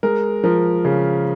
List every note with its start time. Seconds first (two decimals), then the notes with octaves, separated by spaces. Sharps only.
0.03 G#3 A#4
0.44 F3 A#4
0.85 C#3